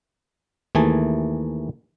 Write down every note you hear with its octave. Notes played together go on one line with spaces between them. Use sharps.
D#2 E3 A3 G#4 G#5 A5